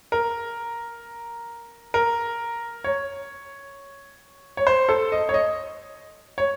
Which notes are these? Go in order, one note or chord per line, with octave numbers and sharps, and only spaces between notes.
A#4
A#4
C#5
C#5
C5
A4
D#5
C#5
D#5
C#5